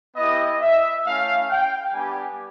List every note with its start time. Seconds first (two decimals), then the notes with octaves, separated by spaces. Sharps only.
0.16 B3 E4 G4 D#5
0.61 E5
1.05 A3 C#4 E4 F5
1.49 G5
1.93 G3 B3 D4 G4 G#5